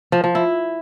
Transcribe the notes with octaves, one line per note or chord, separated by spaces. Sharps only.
F3
F3
E4